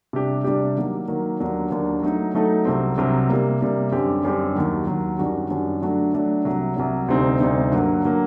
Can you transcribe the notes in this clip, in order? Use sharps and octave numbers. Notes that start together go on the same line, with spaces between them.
C3 G3 D4 G4
C3 G3 D4 G4
D#3 F#3 A#3
D#3 F#3 A#3
D#2 D3 F#3 A#3 D4
D#2 D3 F#3 A#3 D4
F#3 A3 D#4 A4
F#3 A3 D#4 A4
C2 C3 F#3 C4
C2 C3 F#3 C4
C3 G3 A#3
C3 G3 A#3
F#2 D3 G3 C4 G4
F#2 D3 G3 C4 G4
D#2 D#3 F#3
D#2 D#3 F#3
F#2 D#3 G3 D4 F#4
F#2 D#3 G3 D4 F#4
D3 F#3 A3 D4 F#4
D3 F#3 A3 D4 F#4
C2 C3 F#3
C2 C3 F#3
D2 C3 G3 C4 D#4
D2 C3 G3 C4 D#4
G2 D3 F#3 A#3
D3 F#3 A#3